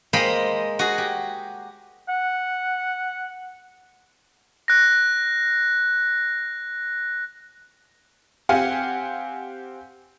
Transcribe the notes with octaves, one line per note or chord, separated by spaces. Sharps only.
G#3 A#3 C5 D#5 G5 B5
F#4 G#4
G4
F#5
F#6 A#6
C4 G4 F5 F#5 G#5